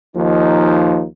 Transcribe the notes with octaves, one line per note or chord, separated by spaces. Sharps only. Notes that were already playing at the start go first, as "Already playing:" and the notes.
D#2 F3 D#4